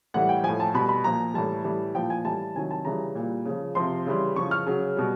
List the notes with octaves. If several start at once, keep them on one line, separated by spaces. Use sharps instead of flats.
A2 E3 G3 F#5
G5
A2 F3 G#5
A5
B2 G3 B5
B5
A#2 F3 A#5
A2 E3 G3 A5
A2 E3 G3
A#2 F3 G5
G#5
A2 E3 G3 A5
C3 D#3 F#3 G#5
A5
C#3 E3 G3 A#5
A#2 G3
C#3 F3
C3 F3 C6
C#3 E3 G3
C#3 F3 C#6
F6
C#3 F#3
B2 G3